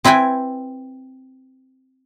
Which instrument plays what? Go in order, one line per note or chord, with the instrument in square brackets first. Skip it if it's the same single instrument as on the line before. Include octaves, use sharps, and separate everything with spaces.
[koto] C4 E4 B4 G5 G#5